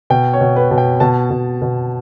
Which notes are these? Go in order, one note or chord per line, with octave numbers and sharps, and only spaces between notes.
B2 G5
C#5
B2
B4
B2
G5
B2 A5
B2
B2